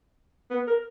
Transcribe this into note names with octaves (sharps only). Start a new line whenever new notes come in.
B3
A#4